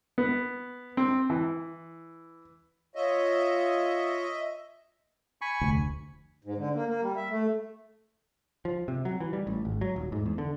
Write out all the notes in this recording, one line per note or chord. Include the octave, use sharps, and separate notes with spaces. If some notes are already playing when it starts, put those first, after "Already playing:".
B3
C4
E3
F4 C#5 D#5 E5
G#5 B5 C#6
F1 D2
G#2
D3
A#3
A#3
G3
E5
A3
F3
C3
F#3
E3
G3
A1
G#1
F#3
D#1
G#2
E2
D3